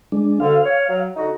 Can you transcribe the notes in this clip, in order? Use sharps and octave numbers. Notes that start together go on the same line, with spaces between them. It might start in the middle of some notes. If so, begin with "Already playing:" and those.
G#3 D4
D2 D3 F5
C#5
F#3
D3 D#4 F#4